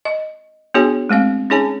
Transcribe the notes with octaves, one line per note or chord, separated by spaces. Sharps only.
D#5
B3 D4 F#4 G#4 C#5 G#5
G#3 A3 C4 F5
C#4 D#4 G#4 C#5 G#5 A5